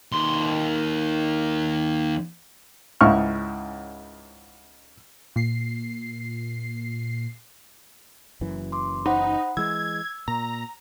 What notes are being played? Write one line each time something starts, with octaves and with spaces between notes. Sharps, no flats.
D#2 C6
C#2 G#2 C#4 E4 C#6 F6
A#2 C7
F#1 F#2 E3
C6 D6
D#4 C5 F#5 B5
E3 G#3 E6 G#6
A#2 A#5